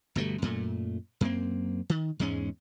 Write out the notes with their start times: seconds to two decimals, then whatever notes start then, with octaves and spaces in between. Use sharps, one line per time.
0.15 G1 B2 G3 A3
0.42 F#2 A#2 A3
1.21 F#2 A#3 C4
1.90 D#3
2.19 E2 G#2 G#3 C#4